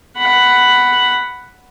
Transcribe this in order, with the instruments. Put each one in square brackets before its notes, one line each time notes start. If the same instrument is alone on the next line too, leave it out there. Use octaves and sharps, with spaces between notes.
[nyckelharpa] F#5 B5